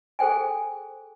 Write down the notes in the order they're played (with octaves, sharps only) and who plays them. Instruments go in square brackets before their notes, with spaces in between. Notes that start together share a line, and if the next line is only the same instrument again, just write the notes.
[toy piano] G#4 A4 C5 G5 G#5